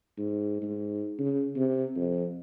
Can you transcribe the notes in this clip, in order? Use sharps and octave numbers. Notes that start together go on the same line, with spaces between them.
G#2
G#2
C#3
C3
F2